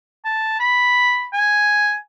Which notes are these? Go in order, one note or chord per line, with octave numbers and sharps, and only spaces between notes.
A5
B5
G#5